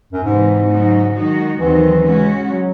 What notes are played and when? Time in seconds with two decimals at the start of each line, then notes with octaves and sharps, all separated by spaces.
0.13 F#2
0.23 G#2 C3 E3 G#3 C4 D#4
0.69 C#3 F#3 A3 D#4 F#4
1.14 D#3 G#3 D#4 F#4
1.59 D#2 D#3 E3 F#3 C4
2.05 C#3 G#3 C#4 F#4
2.50 F#3